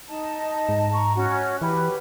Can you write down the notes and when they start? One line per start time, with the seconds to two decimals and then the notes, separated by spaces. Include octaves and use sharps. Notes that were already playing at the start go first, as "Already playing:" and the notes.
0.09 D#4 D#5 A5
0.69 G#2
0.93 A#5 C#6
1.16 C#4 F#4
1.62 E3 G4 B4